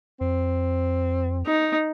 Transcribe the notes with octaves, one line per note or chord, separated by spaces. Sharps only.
F2 C4
D#4